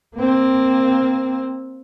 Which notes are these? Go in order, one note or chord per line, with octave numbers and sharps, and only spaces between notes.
A#3 C4